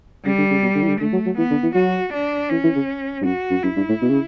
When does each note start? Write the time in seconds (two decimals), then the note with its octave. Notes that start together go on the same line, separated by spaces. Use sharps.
0.25 C#3 G3
0.38 D3
0.51 C#3
0.62 B2
0.75 D3
0.83 E3
0.88 D3
1.00 D3 A3
1.13 F#3
1.26 F#3
1.38 E3 B3
1.50 D3
1.63 E3
1.75 F#3 F#4
2.14 D4
2.50 E3 C#4
2.63 E3
2.75 C#3
3.21 G2
3.26 F#2 F#4
3.50 F#2
3.63 F#2 E4
3.76 G2
3.89 A2
4.02 B2
4.09 C#3